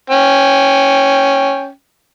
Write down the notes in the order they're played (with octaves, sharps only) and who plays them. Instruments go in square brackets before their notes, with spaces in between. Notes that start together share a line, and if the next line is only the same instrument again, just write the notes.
[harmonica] C#4 G5